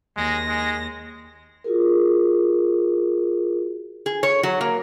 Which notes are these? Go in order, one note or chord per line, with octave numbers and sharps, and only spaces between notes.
D#2 G#3 A#6
G#3
F4 F#4 G#4 A#4
G#4
C#5
F#3
A#3